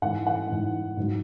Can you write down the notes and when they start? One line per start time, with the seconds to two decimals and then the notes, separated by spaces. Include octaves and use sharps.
0.02 G#2 E3 F#5
0.27 F#5
0.49 G#2 E3
0.97 G#2 F#3